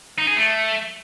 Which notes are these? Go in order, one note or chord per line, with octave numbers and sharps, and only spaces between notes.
D#4
G#4
A3